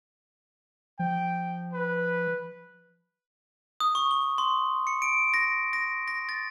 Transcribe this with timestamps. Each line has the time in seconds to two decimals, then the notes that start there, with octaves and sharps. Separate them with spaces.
0.99 F3 G5
1.74 B4
3.80 D#6
3.95 C#6
4.11 G7
4.38 C6
4.87 C#7
5.02 D7
5.34 A#6
5.73 A#6
6.08 A#6
6.29 A6